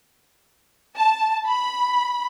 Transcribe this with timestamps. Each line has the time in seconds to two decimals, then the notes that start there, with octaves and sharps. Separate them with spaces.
0.96 A5
1.47 B5